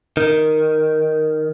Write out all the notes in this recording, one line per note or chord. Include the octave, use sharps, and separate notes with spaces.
D#3